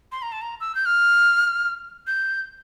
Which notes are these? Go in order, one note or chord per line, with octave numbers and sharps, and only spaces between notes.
C6
A#5
A5
A#5
E6
G6
F6
G6